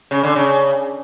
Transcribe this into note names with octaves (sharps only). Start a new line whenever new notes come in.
C#3
D3
C#3